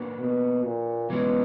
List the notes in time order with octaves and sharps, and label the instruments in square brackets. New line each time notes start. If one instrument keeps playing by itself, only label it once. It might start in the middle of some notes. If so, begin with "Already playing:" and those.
Already playing: [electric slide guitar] A#3 D4 F#4 B4
[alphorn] B2
A#2
[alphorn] B2 [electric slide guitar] E3 G#3 C#4